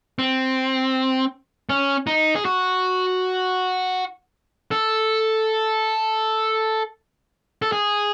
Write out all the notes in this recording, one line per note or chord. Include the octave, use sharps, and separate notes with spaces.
C4
C#4
D#4
G#4
F#4
A4
A4
G#4